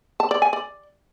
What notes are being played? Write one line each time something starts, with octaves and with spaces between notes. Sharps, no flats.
A5
D5
G#5
D5